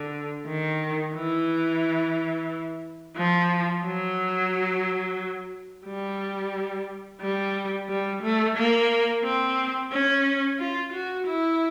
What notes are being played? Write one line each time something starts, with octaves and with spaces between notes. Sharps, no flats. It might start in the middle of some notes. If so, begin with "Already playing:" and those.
Already playing: D3
D#3
E3
F3
F#3
G3
G3
G3
A3
A#3
C4
C#4
F4
F#4
E4